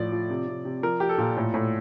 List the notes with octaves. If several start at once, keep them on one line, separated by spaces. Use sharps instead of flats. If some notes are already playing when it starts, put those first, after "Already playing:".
Already playing: A2 F3 D5
F3
C3
C3
C3
F3 A#4
F3 G4
A4
A#2
A2
A2